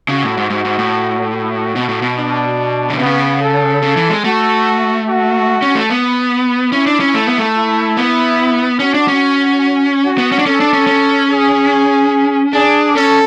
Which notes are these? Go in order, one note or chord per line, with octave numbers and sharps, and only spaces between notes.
C#3 F#4
A2
G#2
G#2 F#4
G#2
A2
F#4
B2
A2
B2
D4
D3
C#3 B3
A4
C#3
E3
G#3
A3 F#4
F#4
C#4
A3
B3
C#4 E4
D4
C#4
A3
B3
A3
E4
B3
C#4 F#4
D4
C#4
F#4
B3
C#4
D4
C#4 A4
D4
C#4
C#4
G#4
D4 G#4
C#4 A4